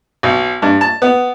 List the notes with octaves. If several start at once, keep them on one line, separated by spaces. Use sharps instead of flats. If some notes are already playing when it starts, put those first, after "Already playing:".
B1
G2
A5
B3